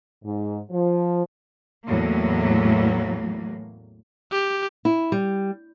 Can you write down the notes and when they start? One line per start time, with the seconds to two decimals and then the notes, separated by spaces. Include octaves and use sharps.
0.24 G#2
0.70 F3
1.86 E2 A2 F#3 A#3
4.32 G4
4.85 E4
5.12 G3